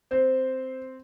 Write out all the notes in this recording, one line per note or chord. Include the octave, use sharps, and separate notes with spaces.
C4 C5